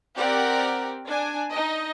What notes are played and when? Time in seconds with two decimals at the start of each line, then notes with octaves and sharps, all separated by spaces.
0.16 C4 G4 A#4 D5 F#5
1.05 D4 G#5
1.50 D#4 D#5